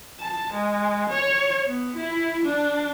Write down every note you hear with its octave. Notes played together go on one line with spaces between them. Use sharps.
A5
G#3
C#5
B3
E4
D4